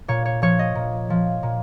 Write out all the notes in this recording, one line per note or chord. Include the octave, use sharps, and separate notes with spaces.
A#2 C#5
C#5
F3 C#5
D#5
A#2
F3
A#2